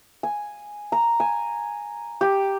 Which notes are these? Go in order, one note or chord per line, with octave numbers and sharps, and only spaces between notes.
G#5
A#5
G#5
G4